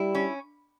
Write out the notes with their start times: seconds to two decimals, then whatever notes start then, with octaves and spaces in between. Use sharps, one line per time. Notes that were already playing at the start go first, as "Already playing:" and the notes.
Already playing: G3 E4
0.15 C#4